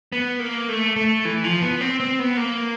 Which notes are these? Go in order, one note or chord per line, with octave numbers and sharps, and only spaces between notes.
B3
A#3
A3
A3
E3
F3
B3
C4
C4
B3
A#3